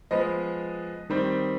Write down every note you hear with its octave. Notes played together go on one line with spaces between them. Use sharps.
F3 G#3 B3 D#5
D#3 G3 C4